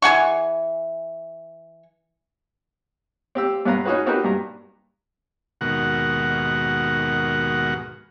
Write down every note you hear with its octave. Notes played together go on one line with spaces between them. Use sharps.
E3 G#4 F#5 C#6
C4 G4 E6
G2 B3 B4 F5 A#5
C#4 D#4 F#4 G#4 B4
C4 D#4 F#4 G4 A#4 B4
G2 A#5
D#2 G#2 B2 F#4 A#4 F#5